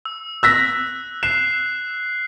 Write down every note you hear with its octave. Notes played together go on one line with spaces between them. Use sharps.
E6
E6 F#6 A#6 B6
F#6 C7 E7